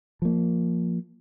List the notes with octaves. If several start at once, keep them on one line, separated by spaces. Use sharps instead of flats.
F3 A#3